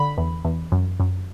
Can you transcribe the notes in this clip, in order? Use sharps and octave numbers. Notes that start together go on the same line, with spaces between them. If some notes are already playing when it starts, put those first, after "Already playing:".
Already playing: D3 B5
E2
E2
F#2
F#2